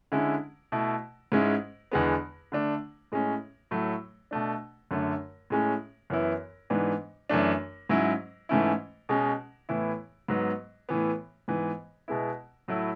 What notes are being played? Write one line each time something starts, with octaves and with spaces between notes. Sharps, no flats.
D3 G#3 C#4 E4
B2 A3 E4
G#2 G#3 C#4 E4
E2 D3 G#3 B3
D3 A3 D4
A2 G#3 C#4
A2 F#3 A3
B2 A3 D4
F#2 D3 A3
A2 G#3 C#4
F#2 E3 B3 E4
G#2 E3 B3 D4
F#2 E3 A3 D4
G#2 F#3 C#4 E4
G#2 E3 A3 C#4 E4
B2 G#3 C#4
A2 E3 B3 E4
G#2 F#3 B3
A2 E3 B3
G#2 E3 B3
B2 G#3 B3 E4
A2 F#3 A3 E4